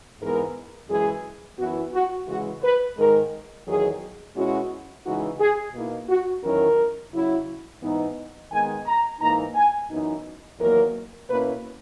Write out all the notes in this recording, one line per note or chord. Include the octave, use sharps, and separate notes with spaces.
G#2 E3 G#3 B3 A#4
F#2 E3 G#3 G#4
F#2 E3 B3 E4 F#4
F#4
C#3 E3 G#3 F#4
B4
G#2 D#3 G#3 A#4
E2 D#3 F#3 G#4
B2 G#3 C#4 E4 F#4
C#3 E3 G#3 D#4 F#4
G#4
B2 A#3 D#4 E4
F#4
E2 D#3 F#3 C#4 E4 A#4
C#3 F#3 C#4 E4
G#2 E3 B3 D#4
D#3 G#3 B3 D#4 G#5
A#5
G#2 E3 A#3 D#4 A#5
G#5
F#2 E3 B3 D#4
E2 D#3 F#3 A#3 A#4
B2 A#3 C#4 E4 B4